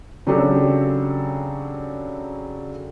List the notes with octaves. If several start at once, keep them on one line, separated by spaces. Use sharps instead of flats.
C#3 F#3 C4 D4 G4 A4